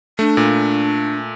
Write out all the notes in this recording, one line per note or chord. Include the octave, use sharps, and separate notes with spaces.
A3 D4
A#2